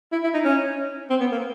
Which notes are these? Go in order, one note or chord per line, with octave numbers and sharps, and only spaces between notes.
E4
E4
D#4
C#4
C4
B3
A#3